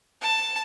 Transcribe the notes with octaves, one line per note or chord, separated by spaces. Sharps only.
A5